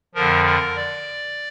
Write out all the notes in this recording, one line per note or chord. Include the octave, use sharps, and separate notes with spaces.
F2 D3 F3 A#4
A#4
D5